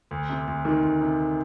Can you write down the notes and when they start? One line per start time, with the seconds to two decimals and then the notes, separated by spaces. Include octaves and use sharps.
0.11 D2
0.30 C3
0.47 D2
0.65 D#3
0.83 D2
1.01 C3